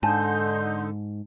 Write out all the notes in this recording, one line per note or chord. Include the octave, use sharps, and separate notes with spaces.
G#2 D3 D#4 G#5 A5 C6 G6